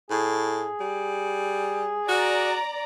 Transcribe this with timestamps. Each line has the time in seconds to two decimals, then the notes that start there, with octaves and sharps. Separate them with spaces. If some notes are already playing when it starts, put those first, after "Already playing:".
0.11 A2 G#4
0.80 G3
2.09 F#4 D5 A#5